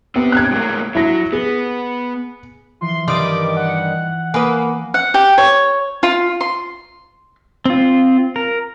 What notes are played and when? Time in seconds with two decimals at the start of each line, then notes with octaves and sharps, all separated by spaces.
0.16 B3 C4 G4
0.32 F#6 G#6
0.51 A2 G#3 A#3
0.95 F#3 E4 A#6
1.32 B3 G#4
2.81 E3 F3 F4 C6
3.08 G2 D#3 G3 C6 D6 D#6
3.57 F#5
4.34 A#3 B4 G#5 B5 D#6
4.94 F#5
5.14 G4
5.38 C#5
6.03 F4
6.41 C6
7.65 C4 F4
8.36 A#4